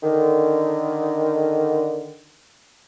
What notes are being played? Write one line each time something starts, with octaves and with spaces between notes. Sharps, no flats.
D3 D#3